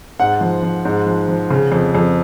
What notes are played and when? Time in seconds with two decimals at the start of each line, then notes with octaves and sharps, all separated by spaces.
0.20 G#2 F#5
0.41 F3
0.63 F3
0.85 G#2
1.07 F3
1.29 F3
1.50 C#3
1.72 F2
1.95 F2